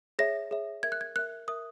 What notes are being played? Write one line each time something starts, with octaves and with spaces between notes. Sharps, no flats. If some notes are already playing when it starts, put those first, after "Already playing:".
G#4 C#5 E5 A#6
G#4 C#5 E5
A#4 E5 G#6
F#6
G#6
A#4 E5 F#6
A#4 E5 D#6